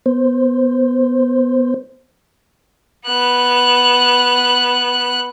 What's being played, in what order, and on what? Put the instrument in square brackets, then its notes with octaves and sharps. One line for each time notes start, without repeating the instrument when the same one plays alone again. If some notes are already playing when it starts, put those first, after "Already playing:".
[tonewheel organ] B3 C5
[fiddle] B3 F#6